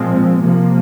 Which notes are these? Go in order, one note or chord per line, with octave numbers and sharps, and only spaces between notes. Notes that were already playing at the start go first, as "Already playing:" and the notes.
Already playing: A#2 F3 G#3 C4
C3 F3 A#3